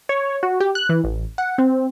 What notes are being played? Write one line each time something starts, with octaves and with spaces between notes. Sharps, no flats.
C#5
F#4
G4
F#6
E3
A1
F#5
C4